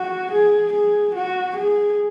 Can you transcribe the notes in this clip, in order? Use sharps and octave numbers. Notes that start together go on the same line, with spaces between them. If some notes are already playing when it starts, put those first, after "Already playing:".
Already playing: F#4
G#4
G#4
F#4
G#4